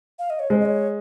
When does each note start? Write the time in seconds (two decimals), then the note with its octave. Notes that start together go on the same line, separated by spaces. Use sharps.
0.19 F5
0.30 D#5
0.39 C#5
0.50 G#3 C5
0.60 D#5
0.65 C#5